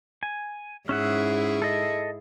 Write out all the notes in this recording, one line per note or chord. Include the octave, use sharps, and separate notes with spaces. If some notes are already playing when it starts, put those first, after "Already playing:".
G#5
G#2 C#4 E4 G#4 E5 F#5
A4 D#5